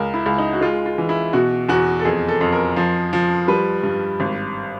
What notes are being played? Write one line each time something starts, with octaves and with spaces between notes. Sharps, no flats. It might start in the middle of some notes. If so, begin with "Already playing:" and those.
Already playing: C#2 A#4
E4
C#2
D#4
F#4
G#3 F4
F4
E3
E4
B2 F#4
E2 F#4
A4
F2 G#4
A4
F2
A#4
F3
F3
G3 B4
G2
G#1